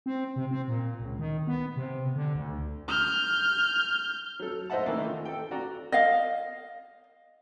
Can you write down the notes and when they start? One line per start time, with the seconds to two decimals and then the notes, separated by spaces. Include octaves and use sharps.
0.06 C4
0.36 C3
0.51 C4
0.68 A#2
1.01 C#2
1.19 D#3
1.47 B3
1.76 C3
2.16 D3
2.36 D2
2.88 F6 G6
4.40 F#3 A4
4.70 C5 D#5 E5 F#5 A5
4.85 D#3 E3 A3 A#3 D4 D#4
5.05 F4
5.25 A4 G5
5.51 F#4 D5 A#5
5.92 D#5 F5